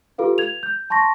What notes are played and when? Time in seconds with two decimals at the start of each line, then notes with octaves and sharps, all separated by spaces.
0.18 F4 G4 A4 B4 F5
0.38 G#6 F7
0.63 G6
0.90 A5 C6 C#6 A#6